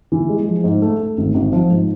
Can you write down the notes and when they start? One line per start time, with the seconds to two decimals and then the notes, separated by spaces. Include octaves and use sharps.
0.12 E3
0.29 G#3
0.47 F3
0.64 G#2
0.82 A3
1.00 A3
1.18 G#1
1.35 G#1
1.53 F3
1.70 G#2